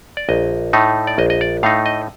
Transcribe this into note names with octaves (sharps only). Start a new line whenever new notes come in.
D5
A#1 D#5
A2 A3 D#4
D5
A#1 D#5
D#5
D5
A2 A3 D#4 F5
D#5